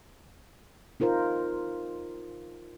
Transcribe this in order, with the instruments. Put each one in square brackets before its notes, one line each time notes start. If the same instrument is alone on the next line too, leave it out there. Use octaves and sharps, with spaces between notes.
[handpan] D#4 F4 A#4 C5